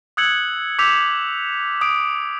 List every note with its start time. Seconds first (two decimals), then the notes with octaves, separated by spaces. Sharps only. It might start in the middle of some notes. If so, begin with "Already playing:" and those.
0.17 D#6 E6 F#6 G#6 C#7 F#7
0.79 D6 E6 G6 B6 F7
1.81 D#6 D7